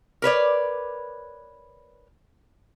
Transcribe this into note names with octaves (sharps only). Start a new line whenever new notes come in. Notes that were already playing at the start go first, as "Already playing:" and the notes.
A#4 B4 C#5 D5